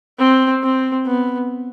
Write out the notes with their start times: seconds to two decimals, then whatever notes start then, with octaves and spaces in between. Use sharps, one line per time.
0.19 C4
0.63 C4
1.06 B3